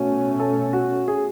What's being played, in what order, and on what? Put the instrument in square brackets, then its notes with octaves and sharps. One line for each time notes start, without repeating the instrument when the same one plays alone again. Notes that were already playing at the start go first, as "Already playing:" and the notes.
Already playing: [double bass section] B2 A3 C#4 [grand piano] F#4
[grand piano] A4
F#4
G#4